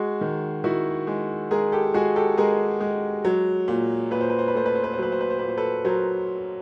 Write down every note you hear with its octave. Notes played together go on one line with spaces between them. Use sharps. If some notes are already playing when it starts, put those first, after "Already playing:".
Already playing: G#3 F#4 G#4
D#3
D#3 E4 F#4
G#3
G#3 G#4 A#4
G4 A4
G#3 F#4 G#4
G4 A4
G#3 G#4 A#4
G#3
F#3
A#2
A#2 B4
C5
B4
C5
B4
A3 C5
B4
C5
B4
C5
F#3 B4
C5
B4
C5
A#2 B4
C5
A4 B4
F#3 A#4 C5